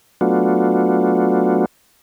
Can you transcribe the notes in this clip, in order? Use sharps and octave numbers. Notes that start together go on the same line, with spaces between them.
F#3 A3 B3 D4 F4 F#4